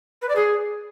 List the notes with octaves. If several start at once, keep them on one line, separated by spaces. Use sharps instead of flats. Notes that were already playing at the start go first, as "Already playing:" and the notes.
B4
D5
G#4